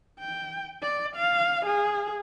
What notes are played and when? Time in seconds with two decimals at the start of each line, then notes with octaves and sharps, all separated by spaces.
0.19 G5
0.83 D5
1.16 F5
1.66 G#4